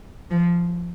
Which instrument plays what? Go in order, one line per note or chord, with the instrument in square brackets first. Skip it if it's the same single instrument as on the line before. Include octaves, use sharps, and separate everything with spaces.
[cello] F3